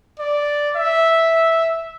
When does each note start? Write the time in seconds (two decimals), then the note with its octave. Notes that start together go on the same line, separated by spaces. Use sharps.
0.19 D5
0.76 E5